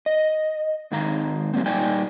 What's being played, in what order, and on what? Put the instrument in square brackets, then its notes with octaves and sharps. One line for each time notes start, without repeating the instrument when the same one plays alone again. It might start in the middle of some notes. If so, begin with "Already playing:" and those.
[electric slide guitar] D#5
G#2 D#3 F5 A#5
F#3 G3 A#3 C4
A#2 G3 D#4 D5 G5 G#5